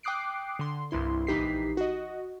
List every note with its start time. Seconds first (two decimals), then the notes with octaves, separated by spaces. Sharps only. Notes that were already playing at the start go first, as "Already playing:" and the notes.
0.03 G5 D6 D#6 F#6 C7 D7
0.59 D3 C6
0.91 C2 G2 E4 C6
1.27 A#1 E3 D#4 G4 B6 C7
1.77 F#4 D#5